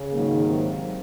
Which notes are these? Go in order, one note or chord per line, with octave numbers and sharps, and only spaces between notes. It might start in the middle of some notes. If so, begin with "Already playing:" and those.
Already playing: C#3
G#2 D#3 F#3 A#3
C3